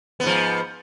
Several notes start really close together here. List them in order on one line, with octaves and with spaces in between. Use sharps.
B3 G#2 F3